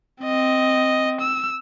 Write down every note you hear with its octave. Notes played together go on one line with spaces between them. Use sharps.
C4 D#5
E6